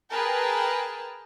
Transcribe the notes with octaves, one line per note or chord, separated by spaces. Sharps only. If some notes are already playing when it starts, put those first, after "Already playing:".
G#4 A#4 B4 G5 A5